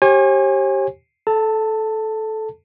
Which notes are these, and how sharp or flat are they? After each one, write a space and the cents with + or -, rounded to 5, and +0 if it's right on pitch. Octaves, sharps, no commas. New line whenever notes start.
G4 -15 C#5 -45 G#5 -20
A4 -15 A5 +15